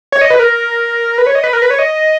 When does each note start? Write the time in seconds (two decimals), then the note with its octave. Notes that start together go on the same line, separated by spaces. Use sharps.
0.12 C#5
0.21 D#5
0.30 B4
0.39 A#4
1.18 B4
1.27 C#5
1.35 D#5
1.44 B4
1.53 A#4
1.62 B4
1.70 C#5
1.79 D#5